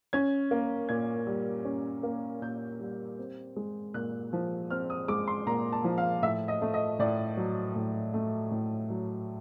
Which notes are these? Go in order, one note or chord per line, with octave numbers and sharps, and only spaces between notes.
C#4 G#6
A#3
A#2 G#6
G3
C#4
A#3
A#2 G6
G3
C4
G#3
A#2 F#6
F3
C4 F6
D#6
G#3 D6
C6
A#2 A#5
A5
F3
F5
A2 E5
D#5
A3
D#5
A2 D5
F#3
A2
A3
A2
F#3